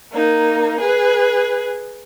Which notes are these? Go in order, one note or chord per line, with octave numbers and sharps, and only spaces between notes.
A#3 D#4
G#4 B4